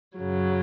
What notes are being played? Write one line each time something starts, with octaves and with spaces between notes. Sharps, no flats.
F#2 C#3 F#3